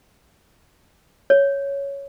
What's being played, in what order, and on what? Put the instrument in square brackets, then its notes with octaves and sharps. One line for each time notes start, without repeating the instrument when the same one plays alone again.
[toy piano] C#5